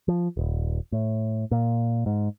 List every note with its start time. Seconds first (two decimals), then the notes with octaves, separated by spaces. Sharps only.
0.08 F3
0.37 D#1
0.92 A2
1.51 A#2
2.06 G#2